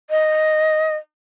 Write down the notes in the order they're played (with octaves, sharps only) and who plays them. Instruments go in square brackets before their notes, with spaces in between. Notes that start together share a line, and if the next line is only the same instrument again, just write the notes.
[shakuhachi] D#5